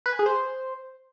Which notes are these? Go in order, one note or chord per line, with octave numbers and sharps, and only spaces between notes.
B4
G#5
G#4
C5